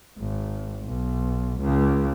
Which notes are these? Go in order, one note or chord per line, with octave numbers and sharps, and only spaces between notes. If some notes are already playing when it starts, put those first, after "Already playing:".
G#1
B1
C#2 C#3